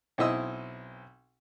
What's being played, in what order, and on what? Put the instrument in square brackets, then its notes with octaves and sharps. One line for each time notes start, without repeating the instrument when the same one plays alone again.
[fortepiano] B1 C4 E4 D#5 E6